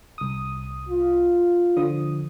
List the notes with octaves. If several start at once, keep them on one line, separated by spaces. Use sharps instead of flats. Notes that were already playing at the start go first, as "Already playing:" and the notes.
C2 D#6
F4
D3 F3 D#6